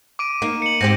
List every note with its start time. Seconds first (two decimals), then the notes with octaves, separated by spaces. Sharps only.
0.19 D6 D7 D#7
0.42 A#3 D#4
0.62 C#7 F#7
0.81 G#2 C4 G4 A#6